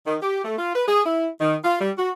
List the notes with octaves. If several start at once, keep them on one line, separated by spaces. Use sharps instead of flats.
D#3
G4
A3
F4
B4
G#4
E4
D#3
F4
G3
F#4